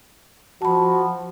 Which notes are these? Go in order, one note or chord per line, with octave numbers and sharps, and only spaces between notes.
F3 F#4 A5 B5